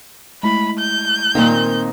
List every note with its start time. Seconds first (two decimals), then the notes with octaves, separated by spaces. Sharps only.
0.43 G#3 A3 E4 B5
0.79 G6
1.35 A#2 D#3 A#3 C4 D#4 F5